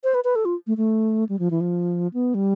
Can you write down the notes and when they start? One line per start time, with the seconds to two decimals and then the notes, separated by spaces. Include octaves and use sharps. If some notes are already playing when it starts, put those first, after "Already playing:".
0.04 C5
0.14 B4
0.24 B4
0.36 A4
0.45 F4
0.67 A3
0.77 A3
1.29 G3
1.39 F3
1.51 E3
1.61 F3
2.14 B3
2.34 G3